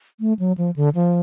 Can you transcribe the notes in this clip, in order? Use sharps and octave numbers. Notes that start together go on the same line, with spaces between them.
A3
F#3
F3
D3
F3